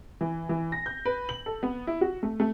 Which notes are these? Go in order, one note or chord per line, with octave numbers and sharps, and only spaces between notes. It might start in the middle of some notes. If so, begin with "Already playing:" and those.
E3
E3
A#6
G6
B4
F#7
A4
B3
E4
F#4
A3
A3